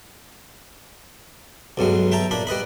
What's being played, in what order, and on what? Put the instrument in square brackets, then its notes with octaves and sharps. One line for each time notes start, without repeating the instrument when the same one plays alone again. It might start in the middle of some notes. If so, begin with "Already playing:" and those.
[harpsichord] B1 G2 F#3 G#3
E5 G5 A5 A#5
A#2 D4 B5
G3 B4 D#5 B5